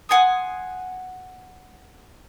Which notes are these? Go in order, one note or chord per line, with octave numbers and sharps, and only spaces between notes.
F#5 G#5 C6 D#6